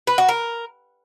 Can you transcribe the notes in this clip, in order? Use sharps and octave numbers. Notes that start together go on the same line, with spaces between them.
B4
F#4
A#4